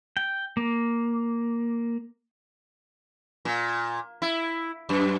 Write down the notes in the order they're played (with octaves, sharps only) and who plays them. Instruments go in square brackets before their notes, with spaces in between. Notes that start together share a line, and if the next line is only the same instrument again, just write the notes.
[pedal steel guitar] G5
A#3
[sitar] A#2
E4
F#2